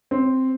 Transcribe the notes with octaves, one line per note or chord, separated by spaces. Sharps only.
C4